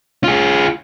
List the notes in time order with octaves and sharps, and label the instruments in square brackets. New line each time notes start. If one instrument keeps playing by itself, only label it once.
[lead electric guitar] F4 G#4